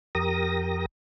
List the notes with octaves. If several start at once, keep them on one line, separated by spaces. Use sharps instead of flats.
F2 G4 A#4 D#6 A#6